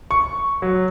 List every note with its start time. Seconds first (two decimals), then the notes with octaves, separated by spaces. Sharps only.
0.11 C#6
0.62 F#3